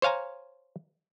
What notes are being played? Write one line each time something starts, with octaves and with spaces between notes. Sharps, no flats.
C5 C#5 F5 G#5 A#5